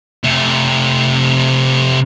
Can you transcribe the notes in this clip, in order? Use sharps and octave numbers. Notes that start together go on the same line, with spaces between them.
C3 A3